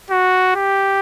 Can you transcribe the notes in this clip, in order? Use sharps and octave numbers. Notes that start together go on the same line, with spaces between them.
F#4
G4